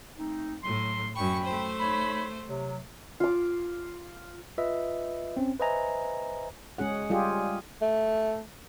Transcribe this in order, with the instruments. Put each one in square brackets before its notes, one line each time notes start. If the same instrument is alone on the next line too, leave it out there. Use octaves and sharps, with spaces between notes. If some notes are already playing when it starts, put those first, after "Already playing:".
[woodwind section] A3 C4 D#4
[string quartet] A2 [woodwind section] F#3 C6
[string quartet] F#2 C#6 [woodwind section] G5 B5
[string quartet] A3 C5
[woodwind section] D#4 C#5 B5
C3 F#3
[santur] F4 D6
[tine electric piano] F4 B4 D#5 E5
C4 C#4
B4 C5 D#5 E5 G#5 A#5
[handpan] G#3 C#4 G#4 F#5
G3 F4 G4 G#4
[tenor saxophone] A3